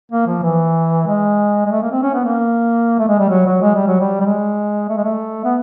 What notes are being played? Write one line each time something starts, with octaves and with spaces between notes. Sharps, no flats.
A#3
F3
E3
G#3
G#3
A3
A#3
C4
C#4
B3
A#3
A3
G#3
G3
F#3
F#3
G#3
G3
F#3
G3
G3
G#3
A3
G#3
A3
B3